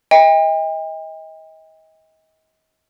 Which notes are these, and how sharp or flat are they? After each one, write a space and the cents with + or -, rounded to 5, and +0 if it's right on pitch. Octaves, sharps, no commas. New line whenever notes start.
D#5 +40 G5 +40